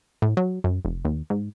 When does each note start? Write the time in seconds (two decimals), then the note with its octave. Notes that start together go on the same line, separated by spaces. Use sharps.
0.22 A2
0.37 F#3
0.64 F#2
0.85 F1
1.05 D#2
1.30 G#2